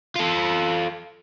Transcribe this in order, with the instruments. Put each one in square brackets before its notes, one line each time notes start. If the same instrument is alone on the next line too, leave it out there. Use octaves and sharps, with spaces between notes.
[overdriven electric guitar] F4 A4